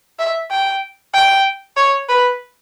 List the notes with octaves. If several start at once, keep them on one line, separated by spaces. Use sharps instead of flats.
E5
G5
G5
C#5
B4